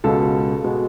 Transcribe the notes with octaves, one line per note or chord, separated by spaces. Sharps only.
C#2 B2 G#3 A4
B2 G#3